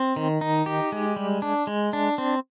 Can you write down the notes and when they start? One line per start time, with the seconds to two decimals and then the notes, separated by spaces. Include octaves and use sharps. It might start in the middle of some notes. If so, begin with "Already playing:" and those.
Already playing: C4
0.16 D#3
0.41 D#4
0.66 G4
0.92 G#3
1.16 G3
1.42 D4
1.67 G#3
1.93 D4
2.18 C4